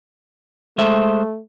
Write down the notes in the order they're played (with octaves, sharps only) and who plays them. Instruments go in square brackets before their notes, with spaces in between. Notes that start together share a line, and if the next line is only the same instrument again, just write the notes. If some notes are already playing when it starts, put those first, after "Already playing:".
[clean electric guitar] G#3 C5 E5 [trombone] A3